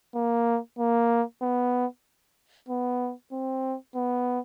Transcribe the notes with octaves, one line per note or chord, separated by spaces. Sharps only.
A#3
A#3
B3
B3
C4
B3